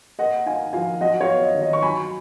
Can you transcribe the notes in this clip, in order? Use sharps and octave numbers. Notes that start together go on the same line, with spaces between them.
A#3 D#5 F#5
D#4 F5 G#5
F3 F5 G#5
F#3 D#5 F#5
C#5 F5
B3
D#5
D#3
D#5
C#6
F#3 G#5 B5